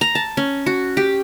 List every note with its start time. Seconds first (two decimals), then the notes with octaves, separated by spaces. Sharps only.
0.01 A#5
0.15 A5
0.37 C#4
0.66 F#4
0.97 G4